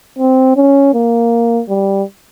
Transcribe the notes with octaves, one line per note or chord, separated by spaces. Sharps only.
C4
C#4
A#3
G3